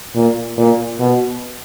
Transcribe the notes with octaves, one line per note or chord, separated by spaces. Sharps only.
A#2
A#2
B2